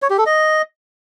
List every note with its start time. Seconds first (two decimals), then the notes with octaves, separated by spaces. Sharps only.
0.02 C#5
0.10 G4
0.18 A4
0.26 D#5